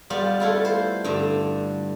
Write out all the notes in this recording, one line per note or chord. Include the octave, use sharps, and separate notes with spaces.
G3 B3 F4
A3 E4 F4
C5
G2 D3